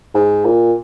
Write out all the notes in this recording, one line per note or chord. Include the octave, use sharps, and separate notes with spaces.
G#2
A#2